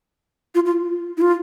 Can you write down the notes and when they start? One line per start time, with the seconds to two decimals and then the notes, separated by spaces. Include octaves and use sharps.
0.55 F4
0.65 F4
1.18 E4
1.21 F4